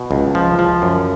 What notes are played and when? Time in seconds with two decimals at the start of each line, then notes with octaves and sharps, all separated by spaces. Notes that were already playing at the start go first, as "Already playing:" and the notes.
Already playing: B2
0.11 C#2
0.35 F3
0.59 F3
0.82 F#2